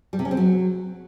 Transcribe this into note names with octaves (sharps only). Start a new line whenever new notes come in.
G3
C3
C#4
C4
F#3